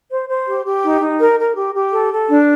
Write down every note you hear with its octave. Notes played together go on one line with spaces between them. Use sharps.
C5
C5
G4
G4
D#4
D#4
A#4
A#4
G4
G4
A4
A4
D4